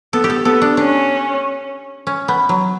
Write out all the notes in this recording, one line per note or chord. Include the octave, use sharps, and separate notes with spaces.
B3 A4
G4
A4
B3 A4
D4
C#4 D4
C#4
B3
F#3